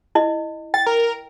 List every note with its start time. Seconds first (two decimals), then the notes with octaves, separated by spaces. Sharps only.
0.15 E4 D#5
0.74 G5 A6
0.86 A#4